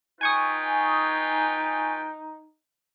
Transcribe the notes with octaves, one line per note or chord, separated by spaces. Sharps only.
D#4 F4 B4 G5 G#5 C#6 D#6